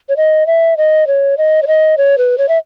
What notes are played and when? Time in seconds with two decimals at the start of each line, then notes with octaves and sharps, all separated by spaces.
0.09 C#5
0.17 D#5
0.47 E5
0.77 D#5
1.07 C#5
1.38 D#5
1.63 C#5
1.67 D#5
1.98 C#5
2.18 B4
2.38 C#5
2.49 E5